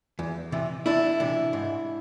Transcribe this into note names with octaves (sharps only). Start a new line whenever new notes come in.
E2
C3 E3
E2 D4 E4
C3 E3
G#2